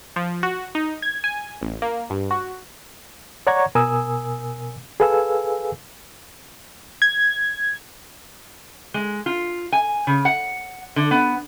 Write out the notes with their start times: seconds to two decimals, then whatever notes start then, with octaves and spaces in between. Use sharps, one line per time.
0.16 F3
0.43 F#4
0.75 D#4
1.02 G#6
1.24 G#5
1.61 A1
1.82 A#3
2.10 G2
2.31 F#4
3.47 C#5 D5 F#5 A#5 C#6 G#6
3.75 B2 A#4 G#5 D#6 E6
5.00 G#4 A4 B4 F5 G#5 E6
7.02 G#6
8.94 G#3
9.26 F4
9.72 G#5
10.07 C#3
10.25 F#5
10.96 D3
11.11 B3